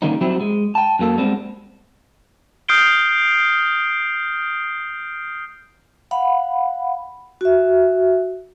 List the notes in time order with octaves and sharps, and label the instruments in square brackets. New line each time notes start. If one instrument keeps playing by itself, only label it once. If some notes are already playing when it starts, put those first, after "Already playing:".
[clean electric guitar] D3 D#3 G3 A#3 C#4 D#4
F#3 G3 C4 E4 G4
G#3
G5 A5
F#2 F#3 A#3 A4
G3 G#3 B3 C4
[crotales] D#6 F6 G6 C7 D7 G7
[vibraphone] F5 F#5 B5
F#4 E5